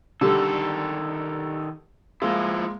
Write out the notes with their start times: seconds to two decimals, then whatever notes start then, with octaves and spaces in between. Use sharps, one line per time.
0.21 D3 D#3 G3 A4
2.22 F3 G#3 A#3 E4